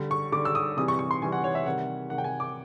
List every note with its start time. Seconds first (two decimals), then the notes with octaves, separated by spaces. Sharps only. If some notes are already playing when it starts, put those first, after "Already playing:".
Already playing: D3 G3
0.11 C#6
0.32 D3 D6
0.35 G3
0.45 E6
0.55 D#6
0.77 C3 E3 G3 D#6
0.88 C#6
0.99 C#6
1.11 C6
1.21 C3 E3 G3 G#5
1.32 F#5
1.44 C#5
1.55 E5
1.66 C3 D#3 G3 F#5
2.10 C3 D#3 G3 F#5
2.18 G5
2.24 G#5
2.40 D6